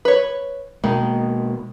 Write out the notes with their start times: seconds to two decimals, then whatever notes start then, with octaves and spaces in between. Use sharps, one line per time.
0.05 B4 C#5
0.84 B2 D#3 G#3 A#3